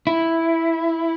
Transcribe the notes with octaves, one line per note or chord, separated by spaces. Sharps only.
E4